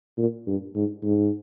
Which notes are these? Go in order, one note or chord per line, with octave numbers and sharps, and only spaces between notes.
A#2
G2
G#2
G#2